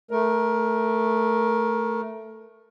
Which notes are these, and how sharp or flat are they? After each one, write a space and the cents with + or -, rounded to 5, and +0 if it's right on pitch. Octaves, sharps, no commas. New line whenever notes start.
A3 +0 A#4 +15